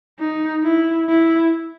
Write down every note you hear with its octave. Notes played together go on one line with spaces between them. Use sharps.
D#4
E4
E4